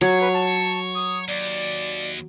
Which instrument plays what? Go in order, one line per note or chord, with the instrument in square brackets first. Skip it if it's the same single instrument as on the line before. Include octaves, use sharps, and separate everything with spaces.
[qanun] F#3 [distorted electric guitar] C#5 [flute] G#6
[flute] B4
A5
D#6
[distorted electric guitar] D#2 [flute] D5